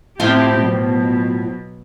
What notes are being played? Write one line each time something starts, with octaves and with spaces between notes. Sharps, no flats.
A2 F3 C4 E4 F4 G4
B2 F#3